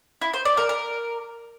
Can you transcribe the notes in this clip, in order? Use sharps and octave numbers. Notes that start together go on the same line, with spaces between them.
E4
C5
D5
A#4
A#4